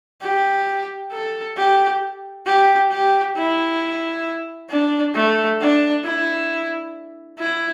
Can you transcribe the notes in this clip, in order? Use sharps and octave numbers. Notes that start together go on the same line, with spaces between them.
G4
A4
G4
G4
G4
E4
D4
A3
D4
E4
E4